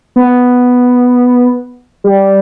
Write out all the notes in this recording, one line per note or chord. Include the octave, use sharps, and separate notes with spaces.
B3
G3